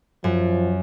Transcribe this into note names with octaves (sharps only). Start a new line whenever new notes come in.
F#2 F3